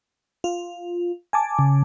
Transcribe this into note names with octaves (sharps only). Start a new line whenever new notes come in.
F4
G#5 A5 D6
C#3